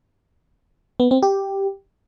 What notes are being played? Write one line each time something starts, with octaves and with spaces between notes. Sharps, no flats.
B3
C4
G4